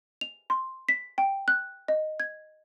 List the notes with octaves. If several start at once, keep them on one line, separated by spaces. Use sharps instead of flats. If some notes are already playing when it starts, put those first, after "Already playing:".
F7
C6
B6
G5
F#6
D#5
G#6